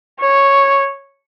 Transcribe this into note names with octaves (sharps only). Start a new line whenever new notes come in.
C#5